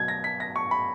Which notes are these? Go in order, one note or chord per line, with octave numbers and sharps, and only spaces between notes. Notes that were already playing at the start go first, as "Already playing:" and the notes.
Already playing: B2 F#3 G#6
A#6
B6
A#6
C#6
B5